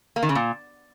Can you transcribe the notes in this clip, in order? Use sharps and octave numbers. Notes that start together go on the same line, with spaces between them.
A#3
D#3
C#3
A#2